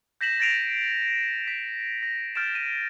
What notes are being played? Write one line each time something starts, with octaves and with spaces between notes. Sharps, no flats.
G6 A#6 B6 E7 F#7
A6 A#6 C7 D7 D#7 F7
B6
A#6
F6 G6 A6 D7 E7
D#7